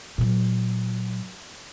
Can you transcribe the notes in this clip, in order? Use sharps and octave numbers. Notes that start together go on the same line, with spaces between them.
A#2 F#3